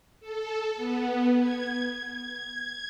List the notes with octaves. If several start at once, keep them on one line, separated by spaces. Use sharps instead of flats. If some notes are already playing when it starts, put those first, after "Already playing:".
A4
B3
G#6
G#6